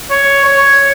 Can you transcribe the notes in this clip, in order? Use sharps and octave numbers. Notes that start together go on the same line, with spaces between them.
C#5
C#5